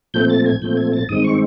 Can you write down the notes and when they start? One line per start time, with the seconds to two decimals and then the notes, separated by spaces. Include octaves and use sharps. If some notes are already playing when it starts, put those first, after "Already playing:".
0.14 A#2 F3 A3 C4 G6
0.30 A6
0.46 G#6
0.62 A#2 F3 A3 C4 G6
0.77 G#6
0.93 A6
1.09 G2 D#3 G#3 C4 D#6
1.24 C#6